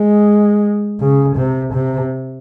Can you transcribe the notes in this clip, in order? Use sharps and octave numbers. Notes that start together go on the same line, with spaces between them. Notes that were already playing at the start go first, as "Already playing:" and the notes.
Already playing: G#3
C#3
C3
C3